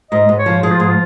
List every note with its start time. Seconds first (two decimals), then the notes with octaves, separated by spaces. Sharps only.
0.11 G#2 D#5
0.29 G#2
0.37 C#5
0.46 F3
0.63 F3 G#4
0.71 F4
0.80 G#2 G#4
0.88 F4